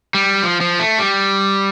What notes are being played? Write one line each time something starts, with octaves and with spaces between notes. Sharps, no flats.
G3
F3
F3
A3
G3